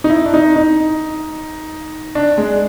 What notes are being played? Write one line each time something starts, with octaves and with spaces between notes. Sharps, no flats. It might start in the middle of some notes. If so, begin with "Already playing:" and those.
D#4
E4
D4
D#4
D#4
D4
G#3